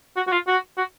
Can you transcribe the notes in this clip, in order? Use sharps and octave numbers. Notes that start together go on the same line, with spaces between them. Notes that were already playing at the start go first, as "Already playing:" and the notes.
F#4
F#4
F4
F#4
F#4